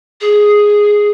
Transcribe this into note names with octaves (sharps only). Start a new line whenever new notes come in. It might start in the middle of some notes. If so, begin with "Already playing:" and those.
G#4